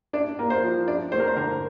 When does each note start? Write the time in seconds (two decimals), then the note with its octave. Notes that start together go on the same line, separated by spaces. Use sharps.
0.13 D4 D5
0.39 A#3
0.50 C5
0.63 F3
0.88 D4 D5
1.12 A3 C5
1.20 A#4
1.28 C5
1.37 D3 A#4